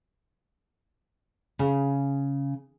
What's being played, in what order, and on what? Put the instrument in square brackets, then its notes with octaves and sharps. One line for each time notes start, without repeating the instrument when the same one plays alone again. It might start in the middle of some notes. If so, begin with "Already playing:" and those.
[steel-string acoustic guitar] C#3